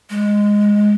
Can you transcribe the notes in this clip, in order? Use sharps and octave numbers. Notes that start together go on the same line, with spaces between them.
G#3